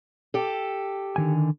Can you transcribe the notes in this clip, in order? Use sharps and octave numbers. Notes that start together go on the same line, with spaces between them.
G4 A4
D3 D#3 G#5